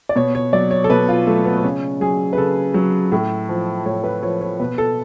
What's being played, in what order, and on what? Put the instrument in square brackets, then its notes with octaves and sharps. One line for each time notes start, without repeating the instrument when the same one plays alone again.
[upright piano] D5
B2 C#5
C#5
F#3 D5
C#5
A4
B2 B4
F4
F#3 A3
B3
B3
C#3 C#4
F#3 G#4
B4
C#3 A4
F#3
A2
F3
A2 C#5
B4
F3 C#5
C#5
B2 B4
A4